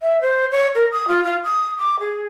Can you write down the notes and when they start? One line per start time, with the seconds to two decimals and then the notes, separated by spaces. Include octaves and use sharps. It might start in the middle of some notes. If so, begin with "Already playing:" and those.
0.01 E5
0.21 C5
0.51 C#5
0.75 A#4
0.92 D#6
1.08 F4
1.24 F4
1.44 D#6
1.78 D6
2.00 G#4